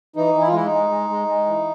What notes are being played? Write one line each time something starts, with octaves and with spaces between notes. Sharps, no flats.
E3 D#4
E3
E4
F4
G#3 E4
D#4
G#3
G#3
G#3
G#3
E3